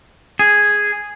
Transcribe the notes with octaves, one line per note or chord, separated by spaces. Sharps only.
G#4